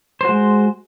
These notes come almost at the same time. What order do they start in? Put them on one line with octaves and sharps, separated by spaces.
C5 F#4 G#3